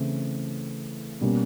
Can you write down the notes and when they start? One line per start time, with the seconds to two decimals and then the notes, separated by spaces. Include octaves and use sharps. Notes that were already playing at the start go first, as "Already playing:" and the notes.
Already playing: C#3 E3 A3 C4 E4
1.21 B2 G3 A#3 C#4